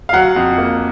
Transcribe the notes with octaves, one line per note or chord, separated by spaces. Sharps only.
F5
F#3 F#5
F2
A#3